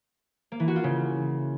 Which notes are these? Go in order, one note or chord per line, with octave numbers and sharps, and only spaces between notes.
A#3
E3
F#4
F4
C#3